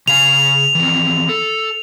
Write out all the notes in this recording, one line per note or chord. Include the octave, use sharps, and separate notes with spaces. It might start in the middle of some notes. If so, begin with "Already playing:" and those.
C#3 F5 G#5 F7
E3 F3 C4
A4